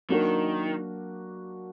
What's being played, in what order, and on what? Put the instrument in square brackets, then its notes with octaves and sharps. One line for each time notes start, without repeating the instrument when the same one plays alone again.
[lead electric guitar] D#3 [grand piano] F#3 A#3 D4 F#4 A#4